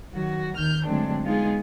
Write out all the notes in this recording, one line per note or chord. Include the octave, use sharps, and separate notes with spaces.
D#3 F#3 F#4
D#2 D#3 F6 G6
D3 F#3 G#3 A3 C4 D4
G#3 B3 D#4 F4 G#4